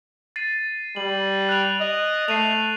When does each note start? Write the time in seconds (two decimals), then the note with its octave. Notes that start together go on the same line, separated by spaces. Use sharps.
0.36 A6 C7 D#7
0.96 G3 F#7
1.49 F#6 D7 F7
1.80 D#5
2.28 A3 C7 D#7 F7